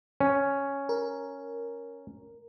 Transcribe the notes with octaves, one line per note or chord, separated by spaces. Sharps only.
C#4
A#4